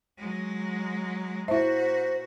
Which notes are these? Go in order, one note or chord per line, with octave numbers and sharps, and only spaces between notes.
F#3 G#3
A#2 E4 F#4 C5 E5